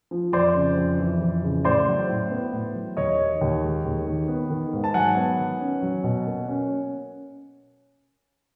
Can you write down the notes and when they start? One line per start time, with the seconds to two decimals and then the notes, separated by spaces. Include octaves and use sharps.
0.11 F3
0.33 F2 C5 D5
0.55 C#3
0.77 F2
0.99 E3
1.21 F2
1.43 C#3
1.64 A2 C5 D5
1.87 F#3
2.09 A2
2.31 B3
2.52 A2
2.75 F#3
2.97 D#2 C#5 D#5
3.18 D#3
3.41 D#2
3.62 G#3
3.85 D#2
4.07 D#3
4.28 B3
4.50 D#3
4.73 G#2
4.84 A5
4.94 F#3 F#5 G#5
5.16 B3
5.38 D#3
5.61 C#4
5.82 F#3
6.04 B2
6.26 A#3
6.48 C#4